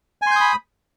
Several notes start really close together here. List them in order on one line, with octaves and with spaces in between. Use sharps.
G#5 C6 G6 D#6 B5